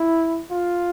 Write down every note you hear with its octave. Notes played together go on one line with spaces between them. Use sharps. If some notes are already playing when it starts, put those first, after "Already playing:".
Already playing: E4
F4